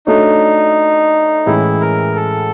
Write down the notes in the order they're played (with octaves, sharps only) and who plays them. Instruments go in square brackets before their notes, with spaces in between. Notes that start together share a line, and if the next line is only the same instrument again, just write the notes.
[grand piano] A3 D4 F#4 A4 C#5 [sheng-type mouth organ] D#4
[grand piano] A2 E3 G#3 C#4 [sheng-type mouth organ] E4
[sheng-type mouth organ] A#4
A4